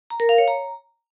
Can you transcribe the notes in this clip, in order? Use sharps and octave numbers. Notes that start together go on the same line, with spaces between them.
A#5
A#4
F5
C#5
A#5